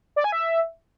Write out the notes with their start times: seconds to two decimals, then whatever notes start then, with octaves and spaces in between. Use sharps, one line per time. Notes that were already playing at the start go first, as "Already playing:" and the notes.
0.16 D5
0.24 G#5
0.32 E5